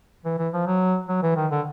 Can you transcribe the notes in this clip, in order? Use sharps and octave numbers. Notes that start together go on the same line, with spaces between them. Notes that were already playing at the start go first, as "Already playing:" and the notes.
E3
E3
F3
F#3
F#3
E3
D#3
D3